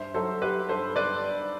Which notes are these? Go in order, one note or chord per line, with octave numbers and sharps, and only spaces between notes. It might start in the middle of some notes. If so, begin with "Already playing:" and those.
Already playing: G2 C5 E5
F#3 A4 C5
F#3 G4 B4
G2 A4 C5
G2 B4 D5